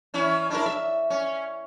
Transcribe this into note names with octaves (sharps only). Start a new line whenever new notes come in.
E3 C#4 E4
D4 E4 A#4
E5
C#4